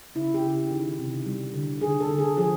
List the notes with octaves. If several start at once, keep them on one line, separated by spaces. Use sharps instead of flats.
C#3 E4
G4
C#3
D#3
C3
G3
D3
D3 G#4
A4
D3
G#4
F3 G#4